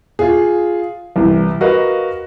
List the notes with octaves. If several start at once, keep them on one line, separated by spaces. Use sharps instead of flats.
F4 G#4
C2 E3
F#4 A#4 B4 D#5 F5